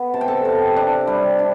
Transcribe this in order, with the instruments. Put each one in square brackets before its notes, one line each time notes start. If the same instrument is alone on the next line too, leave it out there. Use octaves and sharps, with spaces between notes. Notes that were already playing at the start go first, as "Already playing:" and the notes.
Already playing: [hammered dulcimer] B3
C3 A5
G5
A4 A5
C3
D4
G3
D4